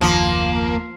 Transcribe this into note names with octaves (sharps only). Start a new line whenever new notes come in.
F#1 D#2 D#3 F3 A#3